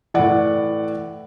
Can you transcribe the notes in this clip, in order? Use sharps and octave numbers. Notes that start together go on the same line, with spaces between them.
A2 E3 D5 F#5